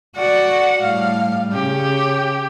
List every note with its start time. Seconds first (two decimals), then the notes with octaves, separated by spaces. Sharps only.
0.16 F#4 D5 F#5
0.82 A2 G3 F5
1.53 C#3 C#4 G4